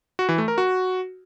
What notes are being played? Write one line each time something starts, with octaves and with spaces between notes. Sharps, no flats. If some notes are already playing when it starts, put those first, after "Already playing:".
F#4
E3
A3
A#4
F#4